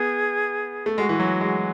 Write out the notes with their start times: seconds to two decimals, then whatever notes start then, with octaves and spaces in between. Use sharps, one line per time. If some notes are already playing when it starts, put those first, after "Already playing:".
Already playing: B3 G#4
0.86 A3
0.97 G#3 F#4
1.09 E3
1.20 F#3
1.41 G#3